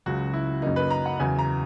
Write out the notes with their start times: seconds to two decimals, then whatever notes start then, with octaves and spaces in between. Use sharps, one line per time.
0.06 C#2 C#3 F#3 F#4
0.34 E4
0.62 F#2 C#3 F#3 A#3 D#4
0.76 B4
0.90 A#5
1.06 F#5
1.20 E2 C#3 F#3 G#5
1.39 A#5